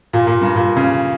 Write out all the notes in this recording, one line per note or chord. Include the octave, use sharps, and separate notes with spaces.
A#2
A#2
G2
A#2
C#3